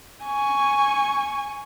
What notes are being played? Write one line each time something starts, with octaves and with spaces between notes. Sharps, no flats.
G#5 C#6